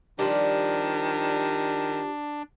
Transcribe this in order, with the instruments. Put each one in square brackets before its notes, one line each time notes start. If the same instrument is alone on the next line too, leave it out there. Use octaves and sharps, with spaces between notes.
[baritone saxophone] D#3 [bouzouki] F3 G3 [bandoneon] D4